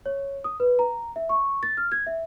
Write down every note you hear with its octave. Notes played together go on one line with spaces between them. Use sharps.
C#5
D#6
B4
A#5
E5
C#6
A6
F6
G#6
E5